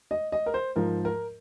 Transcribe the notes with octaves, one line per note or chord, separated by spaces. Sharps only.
D#5
D#5
A#4
C5
G#2 F3 A#4
A#4